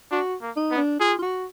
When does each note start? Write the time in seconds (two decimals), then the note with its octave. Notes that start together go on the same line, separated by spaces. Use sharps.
0.11 D4 F#4
0.42 A#3
0.56 D#4
0.71 B3
0.77 D4
1.00 F4 G#4
1.18 F4
1.22 F#4